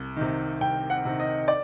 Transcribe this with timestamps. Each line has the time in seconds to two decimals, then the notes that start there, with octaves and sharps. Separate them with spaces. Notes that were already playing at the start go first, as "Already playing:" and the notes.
Already playing: C2
0.17 C3 D#3
0.60 C2 G5
0.90 F#5
1.05 C3 D#3
1.20 D#5
1.48 D5